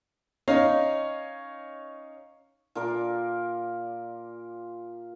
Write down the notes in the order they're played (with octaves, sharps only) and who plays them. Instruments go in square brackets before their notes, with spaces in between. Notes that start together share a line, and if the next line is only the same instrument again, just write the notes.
[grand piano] C#4 D#4 C#5 F5
[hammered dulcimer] A#2 F4 A#4 D5